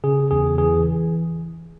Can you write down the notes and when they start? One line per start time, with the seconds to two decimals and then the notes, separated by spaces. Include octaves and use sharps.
0.04 C#3 G#4
0.31 E2 G#4
0.58 E3 G#4